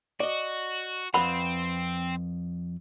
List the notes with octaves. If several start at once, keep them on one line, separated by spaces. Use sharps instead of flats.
F#4 D5 D#5
F2 C4 B4 F#5 B5